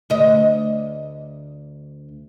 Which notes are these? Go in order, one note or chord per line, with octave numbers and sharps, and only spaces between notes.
D2 D#5